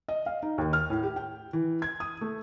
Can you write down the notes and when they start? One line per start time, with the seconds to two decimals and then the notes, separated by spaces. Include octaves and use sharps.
0.08 D#5
0.26 F5
0.43 D#4
0.58 D#2
0.73 F6
0.90 A2
1.03 G4
1.16 G5
1.53 E3
1.82 G#6
2.00 D#6
2.21 A3